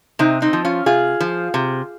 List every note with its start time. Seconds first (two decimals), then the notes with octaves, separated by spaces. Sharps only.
0.19 C3 C4 D#4
0.42 C4 D#4
0.53 F3
0.65 C#4 F4
0.86 C3 F4 G#4
1.21 F3
1.54 C3